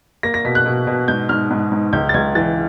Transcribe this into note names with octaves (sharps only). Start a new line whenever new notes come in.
A#3 A#6
A#6
B2 B6
F#6
B2
B2
G#2 G6
G#2 F6
G#2
G#2
C#2 G6
A6
C#2 G#6
E3 A6